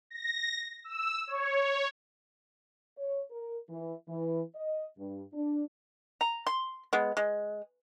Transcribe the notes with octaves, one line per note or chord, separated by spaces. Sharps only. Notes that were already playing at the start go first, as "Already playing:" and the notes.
A#6
E6
C#5
C#5
A#4
E3
E3
D#5
G2
D4
A#5
C6
G#3 B3
G#3